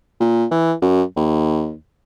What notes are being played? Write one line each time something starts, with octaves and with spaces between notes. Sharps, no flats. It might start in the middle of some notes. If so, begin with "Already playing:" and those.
A#2
E3
F#2
D#2